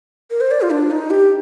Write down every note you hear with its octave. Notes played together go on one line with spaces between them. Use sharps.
A#4
C5
D5
F4
D4
D#4
G4